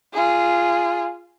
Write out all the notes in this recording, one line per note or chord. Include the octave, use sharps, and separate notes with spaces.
F4 G#4